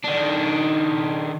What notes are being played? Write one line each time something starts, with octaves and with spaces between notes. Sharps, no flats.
D#3 D4